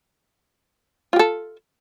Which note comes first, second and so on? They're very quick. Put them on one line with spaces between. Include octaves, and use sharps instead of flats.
F4 G4 A4